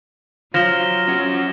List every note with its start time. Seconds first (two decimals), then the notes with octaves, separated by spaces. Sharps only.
0.54 F3 F#3 A#6 E7 G7
1.08 C#4 F#4